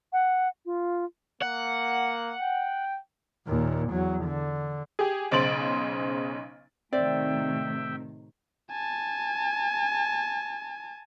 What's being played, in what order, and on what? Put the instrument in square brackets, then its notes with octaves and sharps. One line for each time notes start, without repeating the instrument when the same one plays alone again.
[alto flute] F#5
F4
[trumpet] A#3 [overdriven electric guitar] F#5
[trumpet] G5
[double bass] D#2 A#2
E2 F#3
D3
[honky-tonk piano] G4 G#4
B1 C#3 C5 A6 D7 F#7
[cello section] A2 C3 D#3 [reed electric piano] C4 [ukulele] D5 [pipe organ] E5 G5
[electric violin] G#5 A5